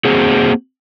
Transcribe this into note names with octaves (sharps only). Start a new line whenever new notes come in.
A#3 C4 F#4 G#4